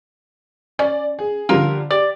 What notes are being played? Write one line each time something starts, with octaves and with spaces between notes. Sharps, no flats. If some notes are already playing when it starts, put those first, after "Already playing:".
C#4 D5
G#4
D3 F3 G3 A#3 F4 A#4
G4 D5